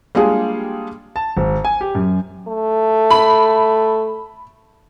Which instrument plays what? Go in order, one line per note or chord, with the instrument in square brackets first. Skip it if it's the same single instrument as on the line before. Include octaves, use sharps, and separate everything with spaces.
[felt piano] G3 G#3 A#3 D4 F4 G#4
[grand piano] A5
G#1
G#5
G4
F#2
[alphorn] A3
[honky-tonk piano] B5